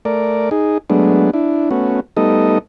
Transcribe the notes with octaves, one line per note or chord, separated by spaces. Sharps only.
A3 A#4 D5
D#4 G#4
F#3 G#3 A3 B3 D4
D4 E4
A3 B3 C#4 F#4
G3 A3 B3 D#4 A4 D#5